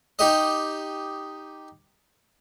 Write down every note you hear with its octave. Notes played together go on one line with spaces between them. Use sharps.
D#4 G4 D#5